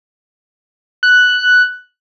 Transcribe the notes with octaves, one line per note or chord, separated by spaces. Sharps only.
F#6